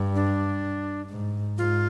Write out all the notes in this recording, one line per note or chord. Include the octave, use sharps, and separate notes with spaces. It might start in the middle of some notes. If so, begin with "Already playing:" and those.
Already playing: G2
D4
G#2
G#2 F4